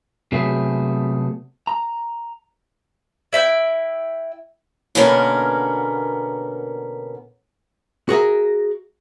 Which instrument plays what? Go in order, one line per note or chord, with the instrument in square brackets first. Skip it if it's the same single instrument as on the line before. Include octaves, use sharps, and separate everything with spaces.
[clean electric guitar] C3 F#3 A3 B3 G#4
A#5
[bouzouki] E4 E5 G5
[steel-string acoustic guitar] B2 D3 A#3 B3 C#4 A#4
[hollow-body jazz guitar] F#4 G#4 A#4 E5